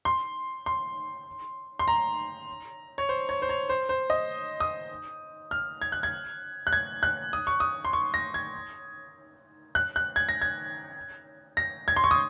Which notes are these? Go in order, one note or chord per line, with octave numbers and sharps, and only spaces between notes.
C6
C6
C6
A#5
C#5
C5
C#5
C5
C#5
C5
C5
D#5
D#6
F6
G#6
F#6
G#6
F#6
G#6
F#6
D#6
C#6
D#6
C6
C#6
A#6
G#6
F#6
F#6
G#6
A#6
G#6
A#6
G#6
C6
C#6
D#6